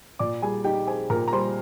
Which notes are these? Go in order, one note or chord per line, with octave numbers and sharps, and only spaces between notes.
A#2 D5 D6
G3 G#4 G#5
D#4 G4 G5
C4 G#4 G#5
A#2 A#4 A#5
A#5
G3 C5 C6